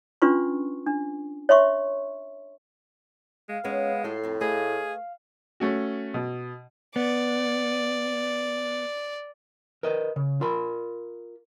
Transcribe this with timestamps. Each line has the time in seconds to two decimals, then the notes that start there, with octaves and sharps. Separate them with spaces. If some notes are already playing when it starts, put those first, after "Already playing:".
0.22 C#4 D4 F4 B4 C6 C#6
0.87 D4
1.49 C#5 E5 C6 C#6
3.49 G#3 F5
3.64 G#3 B3 C#4 B4 C#5
4.04 A2 F4 F#4 A4 C7
4.23 F2 C4
4.41 A3 G#4 B4 D#5 F5
5.60 A3 C#4 F#4
6.14 B2
6.96 B3 D5
9.83 A#4 B4 D#5
10.16 C#3
10.41 F4 A#4 B5